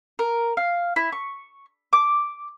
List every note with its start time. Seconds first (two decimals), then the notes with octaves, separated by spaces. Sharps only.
0.19 A#4
0.57 F5
0.96 E4
1.12 C#6
1.93 D6